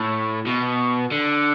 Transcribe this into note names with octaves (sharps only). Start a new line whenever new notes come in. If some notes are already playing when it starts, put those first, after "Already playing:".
Already playing: A2
B2
D3